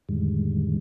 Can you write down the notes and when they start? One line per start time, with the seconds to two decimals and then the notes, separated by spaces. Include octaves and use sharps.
0.09 F2 A2 D3 D#3 G3 G#3